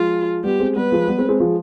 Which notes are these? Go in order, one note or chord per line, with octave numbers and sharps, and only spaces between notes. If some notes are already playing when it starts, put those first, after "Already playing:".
Already playing: F3 G#3 F4
G3 B3 G4
G#3 C4
G3 B3 B4
F3 G#3
G3 B3
G#3 C4
G#3 C4
F3 G#3